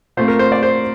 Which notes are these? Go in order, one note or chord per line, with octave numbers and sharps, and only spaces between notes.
A#2 A3 C4 C5
A#4
C5
D5
C5